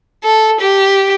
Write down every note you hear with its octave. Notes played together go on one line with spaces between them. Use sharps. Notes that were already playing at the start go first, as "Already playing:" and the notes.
A4
G4